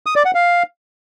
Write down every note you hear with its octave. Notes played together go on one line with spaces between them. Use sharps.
D#6
D5
F#5
F5